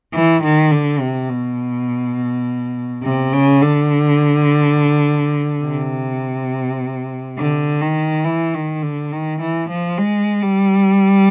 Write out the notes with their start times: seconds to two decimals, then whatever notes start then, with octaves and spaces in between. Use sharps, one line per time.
0.14 E3
0.43 D#3
0.72 D3
1.00 C3
1.29 B2
3.03 C3
3.33 C#3
3.62 D3
5.64 C3
7.38 D3
7.82 D#3
8.25 E3
8.54 D#3
8.82 D3
9.12 D#3
9.40 E3
9.70 F3
9.98 G#3
10.42 G3